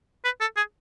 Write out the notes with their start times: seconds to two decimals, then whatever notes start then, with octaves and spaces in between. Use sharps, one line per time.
0.24 B4
0.40 A4
0.57 G#4